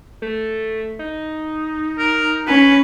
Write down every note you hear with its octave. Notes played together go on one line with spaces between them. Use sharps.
A3
D#4
A#4
C#4 B4